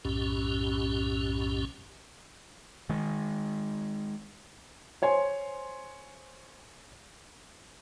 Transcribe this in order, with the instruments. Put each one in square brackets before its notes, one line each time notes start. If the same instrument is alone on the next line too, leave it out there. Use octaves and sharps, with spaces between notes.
[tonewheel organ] B1 F#2 A2 C#4 G4
[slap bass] D#3 G#3
[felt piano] C5 C#5 G#5 C6